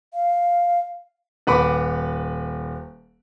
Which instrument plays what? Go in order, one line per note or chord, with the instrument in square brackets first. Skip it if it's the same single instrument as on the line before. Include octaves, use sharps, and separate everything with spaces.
[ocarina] F5
[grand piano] D#1 B4 F#5 B5 D6